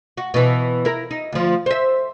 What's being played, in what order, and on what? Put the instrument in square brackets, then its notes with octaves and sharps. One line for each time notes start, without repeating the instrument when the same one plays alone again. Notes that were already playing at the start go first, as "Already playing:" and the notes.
[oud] F#4
B2 E3
E4 A#4
D#4
D2 F3
C5 E5